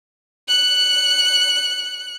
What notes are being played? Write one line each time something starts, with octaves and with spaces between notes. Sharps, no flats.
F#6 C#7